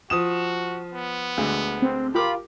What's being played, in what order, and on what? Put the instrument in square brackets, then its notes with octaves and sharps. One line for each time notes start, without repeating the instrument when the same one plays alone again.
[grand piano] F3 D#6 E7 [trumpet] F#4
[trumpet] B3
[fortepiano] D2 D3 G#3
[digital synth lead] C4
[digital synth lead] F4 [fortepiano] G4 A#4 D6 [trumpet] B5